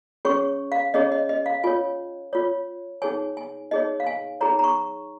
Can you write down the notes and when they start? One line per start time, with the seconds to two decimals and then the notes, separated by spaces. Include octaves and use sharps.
0.25 C#4 G#4 C#5 C#6
0.72 F5
0.94 C#4 G#4 C#5 D#5
1.12 D#5
1.29 D#5
1.46 F5
1.64 F4 C#5 G#5
2.33 F4 C#5
3.02 D#4 G#4 C#5 G#5
3.37 G#5
3.71 D#4 G#4 C#5 D#5
4.00 F5
4.07 G#5
4.41 D#4 G#4 C#5 A#5
4.59 A#5
4.64 C#6